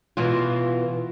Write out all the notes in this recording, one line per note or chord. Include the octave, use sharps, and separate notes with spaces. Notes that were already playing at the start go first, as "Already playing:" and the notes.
B2 E3 F4